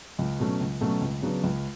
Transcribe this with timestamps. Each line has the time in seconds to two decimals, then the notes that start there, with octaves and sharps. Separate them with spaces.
0.19 C#2
0.40 B2 F#3 A3 C#4
0.61 C#2
0.81 B2 F#3 A3 C#4
1.01 C#2
1.22 C#3 F#3 B3 D4
1.43 C#2